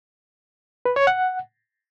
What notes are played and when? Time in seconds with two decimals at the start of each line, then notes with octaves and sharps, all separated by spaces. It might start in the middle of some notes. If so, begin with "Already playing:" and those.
0.85 B4
0.96 C#5
1.07 F#5